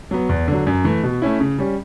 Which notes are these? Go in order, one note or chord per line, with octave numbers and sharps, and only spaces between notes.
F#3 B3
E2
D3 F#3
F#2
E3 A3
B2
A3 C#4 E4
C#3
G3 C#4